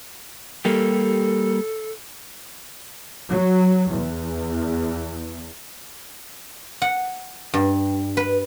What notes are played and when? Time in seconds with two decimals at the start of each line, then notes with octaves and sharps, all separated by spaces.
0.65 G3 A#3 G4 A4
3.31 F#3
3.92 E2
6.82 F#5
7.54 G2
8.17 B4